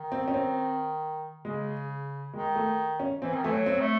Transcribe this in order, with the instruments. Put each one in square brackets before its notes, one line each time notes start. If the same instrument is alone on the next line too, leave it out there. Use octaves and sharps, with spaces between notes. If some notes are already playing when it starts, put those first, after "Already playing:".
Already playing: [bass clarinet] D#3
[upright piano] C4
C#4
C4
[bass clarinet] C#3 [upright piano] G#3
[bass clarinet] D#3 [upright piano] G#3
[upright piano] A3
C#4
[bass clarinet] E3 [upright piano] C4
[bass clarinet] D#3
[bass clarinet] E3 [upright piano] A3
[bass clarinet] F#3
[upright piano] C4
[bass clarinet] A3